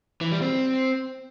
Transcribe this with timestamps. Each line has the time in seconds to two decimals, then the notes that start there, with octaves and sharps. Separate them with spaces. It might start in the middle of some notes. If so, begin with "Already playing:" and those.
0.21 E3
0.31 G3
0.42 C4